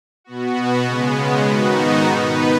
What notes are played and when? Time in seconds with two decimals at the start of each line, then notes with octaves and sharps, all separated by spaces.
0.24 B2 B3 F#4
0.85 C#3 G#3 B3
1.46 G#2 D#3 B3 D#4 F#4
2.07 B2 B3 D#4 B4